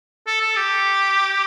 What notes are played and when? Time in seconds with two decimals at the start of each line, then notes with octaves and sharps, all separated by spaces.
0.27 A4
0.41 A4
0.56 G4